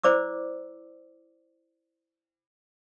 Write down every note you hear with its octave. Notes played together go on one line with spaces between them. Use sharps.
E4 C5 D5 D6 E6